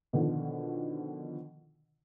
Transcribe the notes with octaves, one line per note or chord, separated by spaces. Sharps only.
B2 D3 D#3 F3